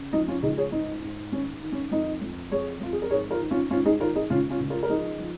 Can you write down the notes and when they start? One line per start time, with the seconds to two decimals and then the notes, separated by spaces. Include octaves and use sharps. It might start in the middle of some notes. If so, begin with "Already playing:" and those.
Already playing: C#3
0.13 F3 D#4
0.28 C#4 F4
0.43 C#2 D#4 G#4
0.57 G#4 C#5
0.72 G#2 D#4
1.02 G#2
1.32 D#3 C#4
1.63 D#3
1.72 C#4
1.91 F2 D#4
2.21 F2
2.51 F2 G#4 C#5
2.81 F2 F4
2.92 G#4
3.02 A#4
3.10 G#2 G#4 C#5
3.31 F4 A#4
3.41 D#3
3.51 C#4 F4
3.70 G#2 C#4 F4
3.85 D#4 G#4
4.00 D#3 F4 A#4
4.15 D#4 G#4
4.30 C#2 C#4 F4
4.50 C#4 F4
4.60 C#2
4.70 F4 A#4
4.83 A#4
4.90 F3 D#4 G#4
5.19 F3